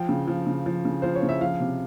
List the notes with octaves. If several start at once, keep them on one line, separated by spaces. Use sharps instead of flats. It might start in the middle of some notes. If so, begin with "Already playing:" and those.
Already playing: F3 G5
C#3
F3
C#3
F3
C#3
F3 C5
C#5
C#3
E5
F3 F5
C3